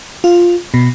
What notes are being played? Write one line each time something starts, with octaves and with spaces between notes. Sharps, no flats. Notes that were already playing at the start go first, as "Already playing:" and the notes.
F4
B2